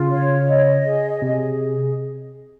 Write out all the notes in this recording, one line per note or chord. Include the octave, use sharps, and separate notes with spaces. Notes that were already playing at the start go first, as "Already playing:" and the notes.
Already playing: C#3 F4
C#5
D#5
G#4
C3 G#4